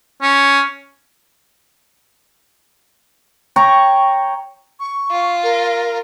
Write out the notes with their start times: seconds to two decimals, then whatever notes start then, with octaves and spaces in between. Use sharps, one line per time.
0.22 C#4
3.56 C#5 G5 A#5 C#6
4.80 C#6
5.11 F4
5.43 A#4